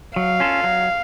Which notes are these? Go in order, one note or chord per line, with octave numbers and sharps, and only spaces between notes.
F#3 F5
C#4 F4 A4
F#3